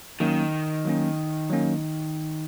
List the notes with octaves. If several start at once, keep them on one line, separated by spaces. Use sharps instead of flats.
D#3 F#3 A#3 C#4
F#3 A#3 C#4
F#3 A#3 C#4